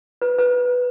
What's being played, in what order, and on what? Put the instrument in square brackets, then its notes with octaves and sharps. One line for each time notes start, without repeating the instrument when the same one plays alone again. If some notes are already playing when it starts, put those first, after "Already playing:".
[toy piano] B4
B4